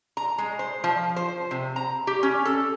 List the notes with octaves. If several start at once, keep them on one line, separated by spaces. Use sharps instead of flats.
A#5
G#3
C5
F3
C5
C3
A#5
G4
C#4
A4